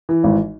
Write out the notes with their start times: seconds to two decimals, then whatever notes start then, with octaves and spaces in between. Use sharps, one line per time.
0.09 E3
0.24 G#1